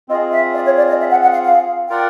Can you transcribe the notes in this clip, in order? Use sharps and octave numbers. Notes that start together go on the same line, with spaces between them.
C4 F4 G#4 D#5
E5
D5
C#5
D5
D#5
E5
F#5
F#5
F5
F5
F4 A#4 D5 F#5 G5